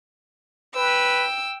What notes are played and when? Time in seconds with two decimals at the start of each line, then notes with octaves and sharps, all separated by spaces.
0.75 B4 G5 E6